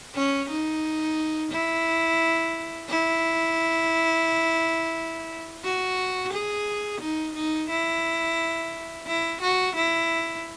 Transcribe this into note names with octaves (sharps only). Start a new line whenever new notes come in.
C#4
D#4
E4
E4
F#4
G#4
D#4
D#4
E4
E4
F#4
E4